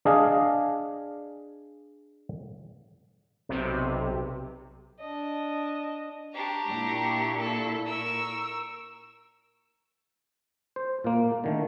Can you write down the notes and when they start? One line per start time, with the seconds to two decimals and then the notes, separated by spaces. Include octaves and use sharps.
0.05 D4 G#4 D#5 F5
3.49 B1 C3
5.00 D4 D#5
6.34 D4 G4 A#5 C#6
6.66 A#2 E4
7.40 A4
7.87 A#4 C#6 E6
10.76 C5
11.04 A#2 A#3
11.44 D3 D#3 A3